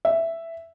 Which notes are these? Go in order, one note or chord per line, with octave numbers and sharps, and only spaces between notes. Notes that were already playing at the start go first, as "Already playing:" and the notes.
E5